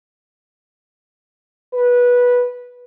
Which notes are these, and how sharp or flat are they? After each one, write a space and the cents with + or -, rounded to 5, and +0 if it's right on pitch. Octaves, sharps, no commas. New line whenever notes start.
B4 -15